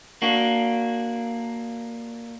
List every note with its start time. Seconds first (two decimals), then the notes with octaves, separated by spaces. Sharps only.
0.22 A#3 D4 F#4